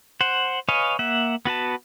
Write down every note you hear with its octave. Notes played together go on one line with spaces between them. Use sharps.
C5 F#5
B4 C#5 D#5 F5 G#5
A#3 E5 F#5
B3 F#4 B4 A5